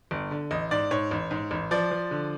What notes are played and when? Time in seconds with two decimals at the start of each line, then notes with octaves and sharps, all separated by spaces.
0.11 G1
0.31 D3
0.51 A1 D#5
0.71 G#2 D5
0.91 G#2 C#5
1.11 A1
1.31 G#2
1.51 A1
1.71 F3 D5
1.91 F3
2.11 D3